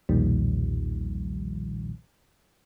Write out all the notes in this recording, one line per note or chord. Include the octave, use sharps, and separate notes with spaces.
B1 E2 A#2 D#3 F3 G3